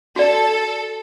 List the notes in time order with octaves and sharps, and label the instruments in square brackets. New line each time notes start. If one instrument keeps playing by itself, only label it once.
[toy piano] F#4 D5 [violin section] A4